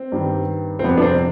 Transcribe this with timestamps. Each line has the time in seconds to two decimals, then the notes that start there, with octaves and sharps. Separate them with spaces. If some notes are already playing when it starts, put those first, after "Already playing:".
Already playing: C4
0.12 G2 D#3 G3
0.79 C4
0.84 F2 C3 G3 B3
0.98 D4
1.02 C4